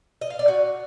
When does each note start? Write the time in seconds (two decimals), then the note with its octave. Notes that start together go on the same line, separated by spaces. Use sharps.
0.21 D#5
0.30 F5
0.39 D5
0.48 F#4